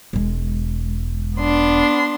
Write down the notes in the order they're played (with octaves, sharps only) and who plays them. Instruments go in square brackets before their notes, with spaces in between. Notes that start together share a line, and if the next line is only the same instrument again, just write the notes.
[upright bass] E1 G#3
[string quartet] B3 D4 C6